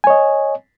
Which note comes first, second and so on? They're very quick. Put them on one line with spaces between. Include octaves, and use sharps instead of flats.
G#5 C#5 D#5